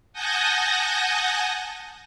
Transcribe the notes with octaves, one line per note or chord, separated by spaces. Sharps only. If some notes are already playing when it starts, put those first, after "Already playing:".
F#5 G#5 A5 D#6 G6 A#6